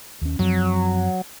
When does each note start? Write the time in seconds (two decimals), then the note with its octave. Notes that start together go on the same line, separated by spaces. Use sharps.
0.22 D#2 C#4
0.39 F#2 F3 F#3 C4